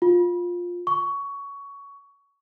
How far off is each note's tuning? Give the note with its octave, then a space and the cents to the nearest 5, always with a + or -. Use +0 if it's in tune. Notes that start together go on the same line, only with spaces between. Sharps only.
F4 +15
C#6 +15